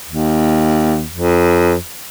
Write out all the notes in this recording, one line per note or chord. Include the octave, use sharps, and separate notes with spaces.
D#2
F2